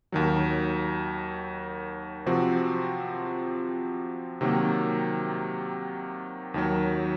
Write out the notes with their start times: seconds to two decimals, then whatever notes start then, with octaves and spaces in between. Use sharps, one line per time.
0.12 D#2 D#3 F#3
2.26 C3 F3 C4 F#4
4.41 C3 D#3 F#3 A#3
6.54 D#2 D#3 F#3